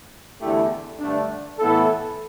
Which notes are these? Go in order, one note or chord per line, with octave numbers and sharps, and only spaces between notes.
E2 D3 A3 E4 G4
G2 D3 A3 D4
A2 E3 B3 E4 A4